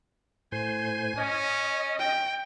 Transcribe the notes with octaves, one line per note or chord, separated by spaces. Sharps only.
A2 C5 G#5
C#4 D#5
G5